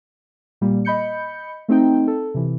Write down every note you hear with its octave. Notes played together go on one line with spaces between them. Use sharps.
A#2 G3 A#3
D#5 B5 G6 C#7
A3 C4 D#4 G5
A4
C3 E3